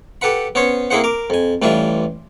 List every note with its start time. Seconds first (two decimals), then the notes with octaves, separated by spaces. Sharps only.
0.21 G4 A4 B4 F#5 B5
0.55 B3 C#4 C5 C#5
0.90 A#3 C4 E4 G#4 C5 F#5
1.04 A#4 D6
1.30 F2 G#5
1.62 A1 E3 G3 D4 F4 E5